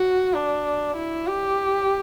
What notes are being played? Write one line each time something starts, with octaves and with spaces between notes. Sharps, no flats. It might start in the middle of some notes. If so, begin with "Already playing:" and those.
Already playing: F#4
D4
E4
G4